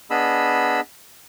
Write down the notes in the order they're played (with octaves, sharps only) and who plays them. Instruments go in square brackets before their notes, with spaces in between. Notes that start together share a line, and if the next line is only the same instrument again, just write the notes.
[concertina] B3 D4 G#4 D#5 B5 E6